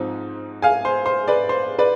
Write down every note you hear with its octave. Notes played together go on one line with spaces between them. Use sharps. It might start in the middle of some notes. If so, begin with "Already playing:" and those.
Already playing: G#2 F3 C4 D#4
F5 G#5
C5
C5
B4 D5
C5
B4 D5